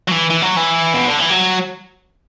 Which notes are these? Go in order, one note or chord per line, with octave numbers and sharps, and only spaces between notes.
F#3
E3
E3
F#3
E3
B2
D3
E3
F#3